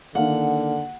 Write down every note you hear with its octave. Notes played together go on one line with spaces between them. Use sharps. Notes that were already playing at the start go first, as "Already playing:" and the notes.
D3 D#3 A#3 F5 F#5